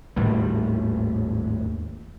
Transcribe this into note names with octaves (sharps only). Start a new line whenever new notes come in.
G#1 D#2 A2 G3